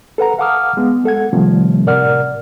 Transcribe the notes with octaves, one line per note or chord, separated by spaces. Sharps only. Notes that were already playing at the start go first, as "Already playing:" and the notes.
A4 B4 F#5 A#5
F5 F#5 A5 D6 D#6 F6
G#3 B3
G#3 A4 F#5 G#6
C3 D#3 F3 G3 A3 C4
A2 C3 A#4 D5 F#5 F6